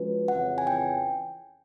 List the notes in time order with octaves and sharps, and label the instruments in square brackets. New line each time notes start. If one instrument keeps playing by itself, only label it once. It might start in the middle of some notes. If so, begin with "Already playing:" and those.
Already playing: [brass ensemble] F3 G#3 C#4 F#4 B4
[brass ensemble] F2 C#3 E3 [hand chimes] F#5
[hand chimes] G#5
G5